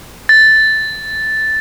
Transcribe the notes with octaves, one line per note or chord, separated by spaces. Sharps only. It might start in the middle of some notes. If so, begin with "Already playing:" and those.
A6